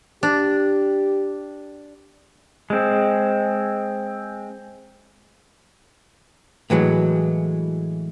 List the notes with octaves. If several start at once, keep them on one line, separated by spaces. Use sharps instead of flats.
D4 G4
G#3 C4
A2 E3 F#3 G#3